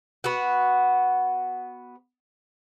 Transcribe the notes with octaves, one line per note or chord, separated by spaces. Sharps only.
B3 F#4